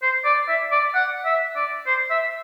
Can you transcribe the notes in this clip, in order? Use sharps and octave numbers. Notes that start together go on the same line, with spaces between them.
C5
D5
E5
D5
F#5
E5
D5
C5
E5